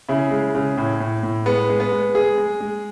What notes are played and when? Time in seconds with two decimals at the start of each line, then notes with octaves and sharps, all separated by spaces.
0.09 C#3 E4
0.31 G#3
0.55 C#3
0.77 A2
1.00 A2
1.23 A2
1.46 G#3 B3
1.69 G#3
1.80 B3
1.92 G#3
2.15 G#3 G#4
2.38 G#3
2.60 G#3